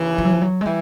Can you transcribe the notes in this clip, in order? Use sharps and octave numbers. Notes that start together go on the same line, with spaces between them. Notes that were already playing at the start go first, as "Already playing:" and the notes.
Already playing: D#2 C#3 E3
F3
F#3
F3
F#3
G#3
E3 G3